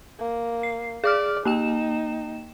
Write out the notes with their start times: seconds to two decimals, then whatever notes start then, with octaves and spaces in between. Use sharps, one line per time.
0.19 A#3
0.63 C7
1.04 G#4 D5 D6 F6
1.45 A#3 D#4 G5 E7